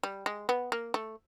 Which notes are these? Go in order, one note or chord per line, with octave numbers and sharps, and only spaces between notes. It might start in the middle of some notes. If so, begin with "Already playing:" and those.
G3
G#3
B3
A#3
A3